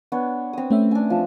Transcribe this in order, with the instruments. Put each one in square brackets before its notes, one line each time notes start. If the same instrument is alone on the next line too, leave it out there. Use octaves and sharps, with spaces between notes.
[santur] B3 D4 C#5
C4 D#6
[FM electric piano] A3 C#4 E5 [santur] G5
[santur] D4 G#5
F3 A5